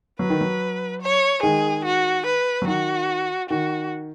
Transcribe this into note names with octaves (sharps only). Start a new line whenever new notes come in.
F#3 B4
D#3
F#3
C#5
D#3 G#3 G#4
F#4
B4
F#3
D#3 F#4
D#3 F#4